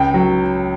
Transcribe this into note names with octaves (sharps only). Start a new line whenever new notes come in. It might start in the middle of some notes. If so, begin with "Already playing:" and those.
Already playing: C#2 G5
F#3